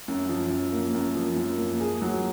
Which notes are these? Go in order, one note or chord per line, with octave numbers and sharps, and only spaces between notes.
F#2
F3
F#2
A#3
F#2
F3
F#2
A#3
G#4
F#3